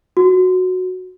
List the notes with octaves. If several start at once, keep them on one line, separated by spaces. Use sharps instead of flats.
F#4